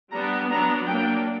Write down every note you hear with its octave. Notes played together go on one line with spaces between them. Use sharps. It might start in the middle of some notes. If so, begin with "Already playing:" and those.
G3 B3 D4 A#5
F#3 B3 D4 A#5
F#3 A#3 D4 G5